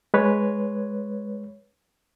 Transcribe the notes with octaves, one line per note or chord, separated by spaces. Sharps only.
G#3 B4 C#5